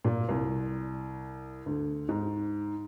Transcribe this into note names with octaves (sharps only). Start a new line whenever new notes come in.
A#2
C2
D2
G#2